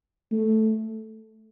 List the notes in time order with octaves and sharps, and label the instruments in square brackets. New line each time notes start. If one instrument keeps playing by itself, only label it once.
[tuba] A3